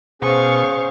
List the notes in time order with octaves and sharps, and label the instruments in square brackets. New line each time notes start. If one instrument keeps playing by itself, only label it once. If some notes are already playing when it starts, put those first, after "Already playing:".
[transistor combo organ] B2 [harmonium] C#4 G#4 [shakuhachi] C5 [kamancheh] F5 C#6